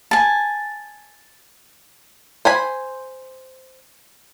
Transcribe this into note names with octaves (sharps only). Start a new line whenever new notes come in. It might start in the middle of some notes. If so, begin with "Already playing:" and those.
G#5 A5
C5 G#5 B5